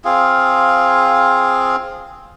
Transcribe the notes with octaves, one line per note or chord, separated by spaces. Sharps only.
C4 F4 G#4 F5